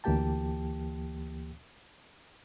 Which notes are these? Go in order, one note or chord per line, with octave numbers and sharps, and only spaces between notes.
D2 E3 A#3 G4 G5 A5